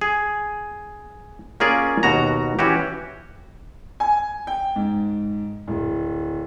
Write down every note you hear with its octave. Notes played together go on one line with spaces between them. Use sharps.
G#4
A#3 C#4 F4 G#4 A#4 D5
D#2 B2 F#4 A#5
E3 C#4 F#4 G4
G#5
G5
G#2
D1